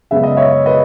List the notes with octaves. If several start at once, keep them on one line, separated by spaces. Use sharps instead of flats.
F#2 C#3 G#3 B3 E5
D#5
C#5 E5
B4 D#5